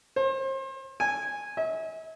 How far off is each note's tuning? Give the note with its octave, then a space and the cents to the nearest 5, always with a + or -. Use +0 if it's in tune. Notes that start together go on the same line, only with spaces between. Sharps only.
C5 +35
G#5 -10
E5 -45